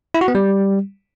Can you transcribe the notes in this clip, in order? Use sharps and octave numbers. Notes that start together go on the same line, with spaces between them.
E4
F#4
B3
G3